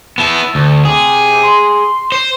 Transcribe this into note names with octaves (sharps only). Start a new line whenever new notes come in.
B3 E4 A5 E6
D2
C3 G#4
C6
C5